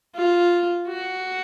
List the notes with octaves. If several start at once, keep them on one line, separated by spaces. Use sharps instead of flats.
F4
F#4